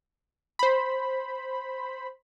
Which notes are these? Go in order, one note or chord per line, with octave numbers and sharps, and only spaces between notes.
C5 B5